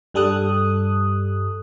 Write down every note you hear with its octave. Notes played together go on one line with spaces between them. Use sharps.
G2 G3 A4 D#6 F#6